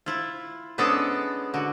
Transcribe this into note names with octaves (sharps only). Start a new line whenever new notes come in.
E4 F4
G#3 B3 C#4 D4 G#4 A4
D3 F#4